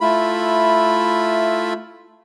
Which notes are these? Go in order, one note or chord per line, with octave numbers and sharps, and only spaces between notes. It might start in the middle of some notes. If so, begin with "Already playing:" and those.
A3 E4 F4 B5